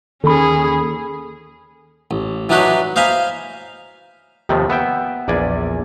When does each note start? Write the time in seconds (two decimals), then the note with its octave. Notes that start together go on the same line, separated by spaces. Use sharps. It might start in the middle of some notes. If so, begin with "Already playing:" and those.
0.24 D#2 D#3 C#4 G#4 A4 B5
2.11 A1
2.49 E3 F#3 D4 D#4 B4 C#5
2.96 C5 D#5 F5 G#5 A#5 B5
4.49 D#2 C3 D#3 F3 A3
4.70 B3 E5 G5
5.28 A#1 E2 D5 G#5